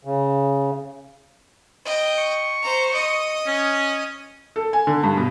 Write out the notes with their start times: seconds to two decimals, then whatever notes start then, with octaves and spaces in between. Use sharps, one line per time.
0.05 C#3
1.85 D#5 G5
2.19 C#6
2.62 C5 A#5
2.93 D#5 D#6
3.47 C#4
4.56 A4
4.73 G#5
4.87 D3
5.03 G2
5.17 B2